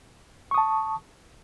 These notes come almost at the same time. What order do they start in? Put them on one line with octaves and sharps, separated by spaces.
C#6 D#6 A5